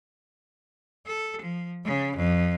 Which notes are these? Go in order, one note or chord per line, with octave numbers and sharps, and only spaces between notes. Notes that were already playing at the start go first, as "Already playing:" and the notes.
A4
F3
C#3
F2